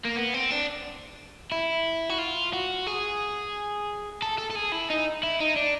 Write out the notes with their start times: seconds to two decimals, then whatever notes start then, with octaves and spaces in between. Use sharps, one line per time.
0.05 A#3
0.16 B3
0.34 C4
0.51 D4
1.52 E4
2.09 F#4
2.18 F4
2.53 F#4
2.87 G#4
4.22 A4
4.38 A4
4.50 A4
4.55 G#4
4.72 E4
4.90 D#4
5.23 E4
5.41 D#4
5.56 D4